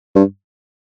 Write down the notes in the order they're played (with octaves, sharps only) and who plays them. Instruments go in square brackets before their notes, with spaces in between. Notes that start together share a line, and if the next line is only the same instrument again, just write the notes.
[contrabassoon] G2